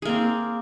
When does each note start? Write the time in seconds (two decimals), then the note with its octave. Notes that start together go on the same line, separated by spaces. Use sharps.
0.02 G#4
0.05 A#3
0.09 C4